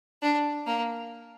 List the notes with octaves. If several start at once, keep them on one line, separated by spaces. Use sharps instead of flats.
D4
A#3